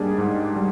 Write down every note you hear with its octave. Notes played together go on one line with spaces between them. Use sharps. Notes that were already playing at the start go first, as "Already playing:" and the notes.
Already playing: G#2 G3 A#3 D4 G#4
G#2
G3